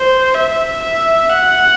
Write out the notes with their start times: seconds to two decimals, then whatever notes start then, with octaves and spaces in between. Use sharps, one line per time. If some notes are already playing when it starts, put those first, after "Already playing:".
Already playing: C5
0.34 E5
0.82 E5
1.29 F#5